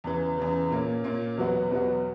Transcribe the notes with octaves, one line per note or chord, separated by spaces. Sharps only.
E2 C#3 E3
E2 C#3 E3
A#2 A#3 C#4
A#2 A#3 C#4
E2 B2 F#3 B3 F#4
E2 B2 F#3 B3 F#4